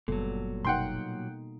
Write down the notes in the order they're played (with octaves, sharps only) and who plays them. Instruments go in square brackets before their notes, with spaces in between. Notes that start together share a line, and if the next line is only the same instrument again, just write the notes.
[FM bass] F#1 [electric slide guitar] A#2 F#3 [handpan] G3 B3 A4
[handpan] B2 A#3 D#4 [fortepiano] F#5 G5 C6